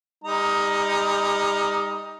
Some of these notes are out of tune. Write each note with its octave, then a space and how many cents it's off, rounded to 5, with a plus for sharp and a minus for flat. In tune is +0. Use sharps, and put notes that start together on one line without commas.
G3 +40 D#4 +15 A#5 +0